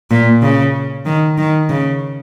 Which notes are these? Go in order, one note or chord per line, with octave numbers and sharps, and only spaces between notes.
A#2
C#3
D#3
D#3
C#3